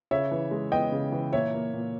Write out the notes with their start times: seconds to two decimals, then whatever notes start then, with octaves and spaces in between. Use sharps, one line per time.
0.11 C#3 C#5 E5
0.31 E3
0.51 G#3
0.71 B3 D#5 G5
0.92 C#3
1.12 E3
1.33 A#2 C#5 E5
1.54 A#3
1.73 A#2